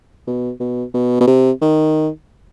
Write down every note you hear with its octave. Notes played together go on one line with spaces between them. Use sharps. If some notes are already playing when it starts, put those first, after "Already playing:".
B2
B2
B2
B2
C3
D#3